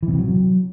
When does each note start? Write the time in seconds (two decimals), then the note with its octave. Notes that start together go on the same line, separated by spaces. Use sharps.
0.03 E3
0.08 B2
0.13 C3
0.19 F#3